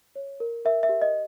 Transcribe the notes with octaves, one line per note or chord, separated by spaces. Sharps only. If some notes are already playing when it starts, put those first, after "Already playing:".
C#5
A#4
A#4 E5
E5
G4
D#5